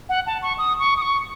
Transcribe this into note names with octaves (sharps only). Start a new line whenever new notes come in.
F#5
A5
C#6
D#6
C#6
D#6
C#6